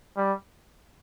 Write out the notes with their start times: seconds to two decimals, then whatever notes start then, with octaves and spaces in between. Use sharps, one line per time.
0.17 G3